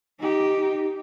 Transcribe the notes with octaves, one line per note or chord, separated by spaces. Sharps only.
D#4 G4